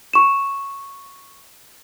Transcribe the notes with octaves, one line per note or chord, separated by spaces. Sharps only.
C#6 E7